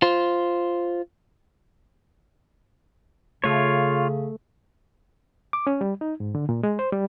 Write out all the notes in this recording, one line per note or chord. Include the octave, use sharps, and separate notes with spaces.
F4 C5
C#3 A3 F4 C#5
D6
C#4
G3
D#4
G#2
D3
A#2
G#3
C5
G3